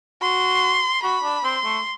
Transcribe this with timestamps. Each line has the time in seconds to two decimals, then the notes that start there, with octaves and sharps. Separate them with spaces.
0.22 F#4 C6
1.03 F#4 B5
1.24 D4
1.44 C4 C6
1.65 A3